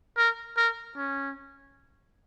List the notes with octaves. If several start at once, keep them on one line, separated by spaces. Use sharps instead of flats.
A#4
A#4
C#4